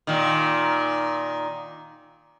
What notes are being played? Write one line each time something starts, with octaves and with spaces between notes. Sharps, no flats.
A#2 D#3